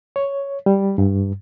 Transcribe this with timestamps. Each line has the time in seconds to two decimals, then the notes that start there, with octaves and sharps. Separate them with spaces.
0.16 C#5
0.66 G3
0.98 G2